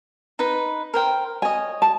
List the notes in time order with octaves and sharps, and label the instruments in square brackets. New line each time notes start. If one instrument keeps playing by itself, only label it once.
[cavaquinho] D#4 B4
A#4 C5 G5
[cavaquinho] C#5 D#5 [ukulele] G#5
[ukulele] A5